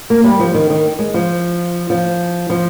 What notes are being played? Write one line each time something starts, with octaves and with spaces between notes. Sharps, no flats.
A#3
G3
F3
D#3
D#3
G#3
F3
F3
F3